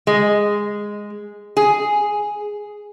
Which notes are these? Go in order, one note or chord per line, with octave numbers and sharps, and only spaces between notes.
G#3
G#4